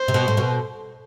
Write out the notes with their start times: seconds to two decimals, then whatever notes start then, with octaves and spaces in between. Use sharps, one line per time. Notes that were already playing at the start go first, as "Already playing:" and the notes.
Already playing: C5
0.08 C3
0.14 B2
0.28 A2
0.37 B2